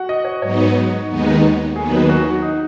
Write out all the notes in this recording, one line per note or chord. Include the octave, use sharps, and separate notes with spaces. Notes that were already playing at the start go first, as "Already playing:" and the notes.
Already playing: F#4 F#5
D#5
C#5
G#2 F#3 B3 D#4 C#5
D#2 D#3 G#3 B3 D#4
D#2 D#3 F#3 B3 G#4
D#4
F#4
F#4
D#4